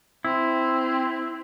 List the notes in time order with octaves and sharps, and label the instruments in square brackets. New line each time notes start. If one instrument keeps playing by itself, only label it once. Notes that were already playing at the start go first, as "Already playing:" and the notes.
[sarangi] C4 [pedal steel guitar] E4